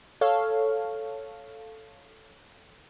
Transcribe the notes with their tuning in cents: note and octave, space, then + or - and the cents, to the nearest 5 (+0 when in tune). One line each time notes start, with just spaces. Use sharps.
A4 +0 C#5 +0 F5 +0